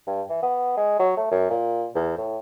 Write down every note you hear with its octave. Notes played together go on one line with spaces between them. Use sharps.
G2
E3
B3
G#3
F#3
A3
F#2
A#2
E2
A2